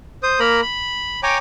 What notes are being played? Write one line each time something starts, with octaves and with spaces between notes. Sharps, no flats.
C5 D#6
A#3 A#4 A#5 B5
B5
C#5 G5 G#5 A#5 D6